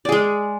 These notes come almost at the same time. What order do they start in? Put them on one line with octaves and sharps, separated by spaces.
D5 G#4 G#3